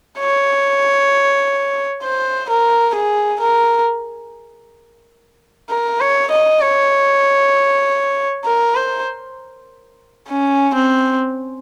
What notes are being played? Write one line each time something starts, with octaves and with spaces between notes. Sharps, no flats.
C#5
C5
A#4
G#4
A#4
A#4
C#5
D#5
C#5
A#4
C5
C#4
C4